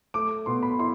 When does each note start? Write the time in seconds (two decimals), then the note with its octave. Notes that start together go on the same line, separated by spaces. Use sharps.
0.14 A3 D6
0.46 B2 C6
0.63 B5
0.79 E4 C6